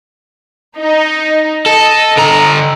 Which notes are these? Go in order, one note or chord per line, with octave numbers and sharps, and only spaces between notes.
D#4
A4 D#5
D3 A#5